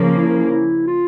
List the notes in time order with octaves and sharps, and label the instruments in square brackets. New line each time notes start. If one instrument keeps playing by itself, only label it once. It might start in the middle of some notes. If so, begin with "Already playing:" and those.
Already playing: [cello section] C#3 F3 A#3
[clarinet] E4
E4
F4